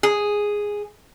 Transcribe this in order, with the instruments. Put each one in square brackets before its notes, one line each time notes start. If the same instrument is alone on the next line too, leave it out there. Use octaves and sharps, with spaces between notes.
[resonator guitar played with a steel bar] G#4